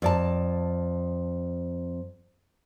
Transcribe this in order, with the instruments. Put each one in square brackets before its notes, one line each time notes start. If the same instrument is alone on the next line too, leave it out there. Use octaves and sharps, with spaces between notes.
[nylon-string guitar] F2 D5 A5